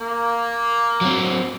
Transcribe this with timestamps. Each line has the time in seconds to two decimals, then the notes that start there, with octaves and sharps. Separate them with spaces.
0.01 A#3
1.01 F#3 C4